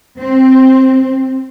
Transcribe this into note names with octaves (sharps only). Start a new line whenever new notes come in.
C4